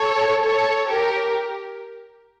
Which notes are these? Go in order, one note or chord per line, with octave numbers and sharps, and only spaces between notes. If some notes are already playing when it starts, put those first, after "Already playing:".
Already playing: A4 C#5
A4 C#5
G4 A#4